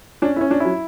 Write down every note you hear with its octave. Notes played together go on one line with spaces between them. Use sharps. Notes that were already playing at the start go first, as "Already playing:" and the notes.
C#4 D4
E4
C#4
D4
F#3 E4